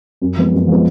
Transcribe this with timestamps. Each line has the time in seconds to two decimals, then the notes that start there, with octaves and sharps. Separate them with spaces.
0.22 F#2
0.36 F3 G#3 B3
0.53 F#2
0.67 F3 G#3 B3